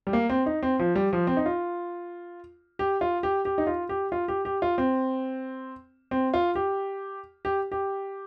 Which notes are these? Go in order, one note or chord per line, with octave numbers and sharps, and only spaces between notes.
G3
A#3
C4
D#4
C4
F3
G3
F3
C4
D#4
F4
G4
F4
G4
G4
D#4
F4
G4
F4
G4
G4
F4
C4
C4
F4
G4
G4
G4